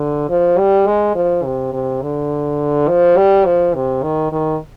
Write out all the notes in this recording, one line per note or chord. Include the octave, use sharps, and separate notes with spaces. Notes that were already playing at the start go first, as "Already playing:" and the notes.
Already playing: D3
F3
G3
G#3
F3
C3
C3
D3
F3
G3
F3
C3
D#3
D#3